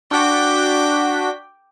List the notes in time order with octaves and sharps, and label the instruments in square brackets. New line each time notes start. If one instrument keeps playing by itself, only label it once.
[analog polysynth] D4 F#4 B6 [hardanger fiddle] G5 D6